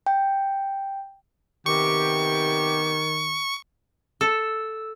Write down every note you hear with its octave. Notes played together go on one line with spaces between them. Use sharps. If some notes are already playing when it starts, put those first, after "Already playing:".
G5
C3 D#3 B3 G4 C#6
A4 E6